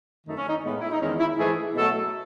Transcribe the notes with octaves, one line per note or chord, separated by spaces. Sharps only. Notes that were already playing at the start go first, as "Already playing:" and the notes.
F#2 D#3 A3 D#4
C#4
D#4
A2 G#3 B3
E4
D#4
E2 D#3 G#3 C#4
E4
G#2 E3 A3 G#4
B2 F#3 A3 A4